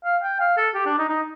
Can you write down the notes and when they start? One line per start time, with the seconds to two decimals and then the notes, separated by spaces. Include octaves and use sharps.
0.04 F5
0.23 G5
0.40 F5
0.57 A4
0.74 G4
0.86 D4
0.98 D#4
1.09 D#4